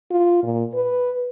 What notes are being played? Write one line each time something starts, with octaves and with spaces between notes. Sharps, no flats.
F4
A#2
B4